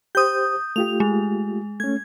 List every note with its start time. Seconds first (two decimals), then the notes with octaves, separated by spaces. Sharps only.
0.15 G4 C5 D#6 G6
0.76 A3 F4 G4 F7
1.00 G#3
1.80 A3 C#4 G#6